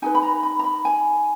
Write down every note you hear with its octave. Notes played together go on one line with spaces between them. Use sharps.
D#4 G#4 B4 G#5
B5
A#5
B5
A#5
B5
G#5